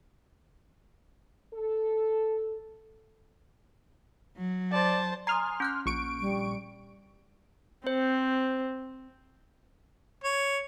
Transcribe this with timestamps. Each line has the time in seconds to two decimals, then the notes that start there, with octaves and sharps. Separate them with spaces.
1.54 A4
4.37 F#3
4.72 C5 D5 A5
5.27 G#5 A#5 C6 D#6 F6
5.60 C#4 F#6 G6
5.86 A#1 C#6 D7
6.21 G3
7.87 C4 C5
10.24 C#5